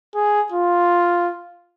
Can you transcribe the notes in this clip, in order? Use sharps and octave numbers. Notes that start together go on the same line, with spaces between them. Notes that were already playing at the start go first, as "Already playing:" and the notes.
G#4
F4